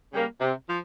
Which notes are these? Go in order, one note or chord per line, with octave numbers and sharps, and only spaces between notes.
C#3 G3 A#3
C3
F3